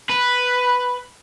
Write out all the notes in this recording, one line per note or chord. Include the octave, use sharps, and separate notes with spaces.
B4